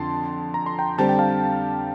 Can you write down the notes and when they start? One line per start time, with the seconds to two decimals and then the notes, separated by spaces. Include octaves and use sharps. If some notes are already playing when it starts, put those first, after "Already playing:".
Already playing: F2 D3 A5 C6
0.54 A#5
0.66 C6
0.79 G5 A#5
0.98 D3 G3 C4 G4 A5
1.09 G5
1.19 F5 A5